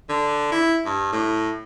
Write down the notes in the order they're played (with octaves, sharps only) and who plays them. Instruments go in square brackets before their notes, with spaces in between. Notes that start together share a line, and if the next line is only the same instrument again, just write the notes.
[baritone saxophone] D3
E4
G2
A2